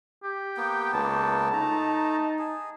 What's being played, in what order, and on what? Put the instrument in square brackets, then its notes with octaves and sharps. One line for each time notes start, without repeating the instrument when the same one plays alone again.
[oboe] G4
[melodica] A#3 B3 G5
[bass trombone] C#2 [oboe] A5
[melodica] A3 A#5 [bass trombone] D#4
[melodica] G#4